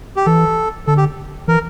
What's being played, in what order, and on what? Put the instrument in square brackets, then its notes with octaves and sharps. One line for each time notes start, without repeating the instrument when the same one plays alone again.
[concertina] G4
[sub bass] E3 [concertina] A4
[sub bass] D3 [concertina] A4
[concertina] G4
[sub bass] E3 [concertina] A#4